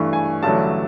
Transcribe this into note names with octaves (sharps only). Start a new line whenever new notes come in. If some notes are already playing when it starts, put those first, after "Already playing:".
Already playing: G2 E3 A3 C#6
G#5
A1 G2 D3 F#3 A3 A5